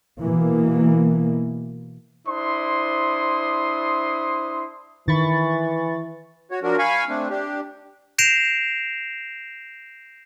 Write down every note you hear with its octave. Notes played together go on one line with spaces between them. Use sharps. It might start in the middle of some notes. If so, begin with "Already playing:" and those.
B2 E3 A#3
D4 E4 C5 C6 D#6
D#3 E3 B5 C#6 A6
F#4 C#5
F3 F#3 D4 F#4 A#4
F5 G#5 B5 C#6
A3 C4 D4
D4 G4
G6 A#6 C7 D7 E7 F7